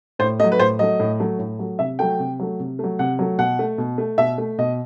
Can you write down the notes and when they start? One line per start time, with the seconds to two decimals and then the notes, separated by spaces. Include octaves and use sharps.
0.19 A2 C5
0.40 A3 D#5
0.44 F#3
0.52 B4
0.59 A2 C5
0.79 F#3 A3 D#5
1.00 A2
1.20 F#3 A3
1.39 A2
1.59 F#3 A3
1.79 C3 E5
1.99 F#3 A3 G5
2.19 C3
2.39 F#3 A3
2.59 C3
2.79 F#3 A3
2.99 C3 F#5
3.19 F#3 A3
3.38 B2 F#5
3.59 A3
3.78 B2
3.98 A3
4.18 B2 E5
4.38 A3
4.58 B2 D#5